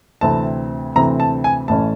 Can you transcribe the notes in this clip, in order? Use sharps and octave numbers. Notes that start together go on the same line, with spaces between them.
D2 C3 E3 A3 C4 A5
D2 C3 E3 A3 C4 A#5
A5
G#5
A1 A2 E3 A3 C#4 A5